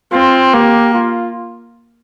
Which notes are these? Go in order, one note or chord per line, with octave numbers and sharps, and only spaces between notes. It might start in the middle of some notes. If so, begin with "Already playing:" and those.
C4 F4
A#3 G4
F4